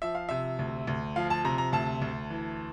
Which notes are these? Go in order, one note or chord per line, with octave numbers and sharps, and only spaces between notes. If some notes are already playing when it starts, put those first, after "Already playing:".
F3 E5
F5
C3 E5
D2
D2
F3 F5
A5
C3 A#5
A#5
D2 A5
D2
E3